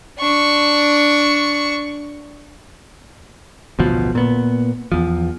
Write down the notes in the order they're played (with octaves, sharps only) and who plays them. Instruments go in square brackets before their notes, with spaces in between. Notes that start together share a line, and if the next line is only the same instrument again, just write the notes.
[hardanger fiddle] D4 C#6
[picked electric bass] A1 D2 B2 F3
A#2 B3
E2 F3